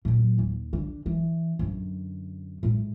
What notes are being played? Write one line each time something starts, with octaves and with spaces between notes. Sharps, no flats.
A#2 F#3
D#2
D3
E3
F#2 D3
A2 G#3